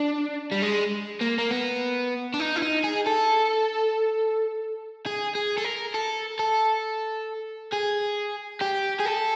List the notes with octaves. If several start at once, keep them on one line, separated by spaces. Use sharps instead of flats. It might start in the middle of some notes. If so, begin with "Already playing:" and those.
Already playing: D4
G3
G#3
A#3
A#3
B3
D4
D#4
E4
D#4
G#4
A4
G#4
G#4
A4
A#4
A4
A4
G#4
G4
G#4
A4